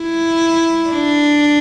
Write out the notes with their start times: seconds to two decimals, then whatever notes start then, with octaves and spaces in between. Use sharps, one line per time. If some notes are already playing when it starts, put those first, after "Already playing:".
Already playing: E4
0.90 D4